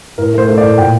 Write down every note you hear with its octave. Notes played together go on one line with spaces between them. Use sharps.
A2 A#4
A3 C5
A3
A2 D5
A#2 G5